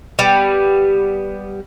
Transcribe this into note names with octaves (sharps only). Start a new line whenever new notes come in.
G3 B3